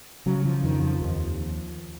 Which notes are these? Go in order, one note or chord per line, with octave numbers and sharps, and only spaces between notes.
C#3 F#3
F3
F2 D#3
F3
D#2